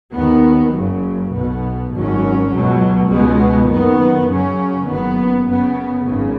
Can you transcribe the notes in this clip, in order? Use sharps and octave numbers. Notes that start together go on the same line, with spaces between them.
D#2 D#3 B3
F#1 F#2 C#3 F#3
B1 B2 B3
G#1 F#2 F#3 C#4
C#2 B2 F#3
C#2 B2 G#3 B3
F#1 F#2 D#3 B3
F#2 C#3 F#3 C#4
F#1 F#2 D#3 F#3 B3
F#2 C#3 B3
G#1 F#2 C#3